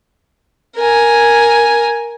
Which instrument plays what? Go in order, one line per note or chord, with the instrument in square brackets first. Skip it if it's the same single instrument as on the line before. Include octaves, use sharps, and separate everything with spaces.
[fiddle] A#4 G#5